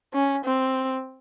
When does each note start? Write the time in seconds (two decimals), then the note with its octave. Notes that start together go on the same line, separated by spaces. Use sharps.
0.14 C#4
0.45 C4